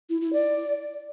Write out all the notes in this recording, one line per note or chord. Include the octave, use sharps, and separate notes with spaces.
E4
E4
D5